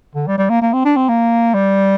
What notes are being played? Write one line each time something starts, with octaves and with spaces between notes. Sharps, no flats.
D3
G3
G3
A#3
A#3
C4
D4
C4
A#3
G3